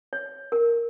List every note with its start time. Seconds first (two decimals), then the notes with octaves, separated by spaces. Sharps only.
0.13 C#5
0.52 A#4